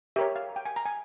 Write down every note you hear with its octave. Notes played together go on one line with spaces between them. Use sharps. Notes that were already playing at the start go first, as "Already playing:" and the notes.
G4 A#4 C#5 E5
F5
G5
G#5
A#5
G#5